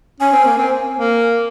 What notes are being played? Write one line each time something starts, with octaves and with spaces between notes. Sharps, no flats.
C#4 G#5
C4
A#3
C4
A#3